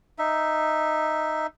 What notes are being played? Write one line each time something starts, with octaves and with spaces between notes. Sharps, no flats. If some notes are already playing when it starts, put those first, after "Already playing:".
D#4 E5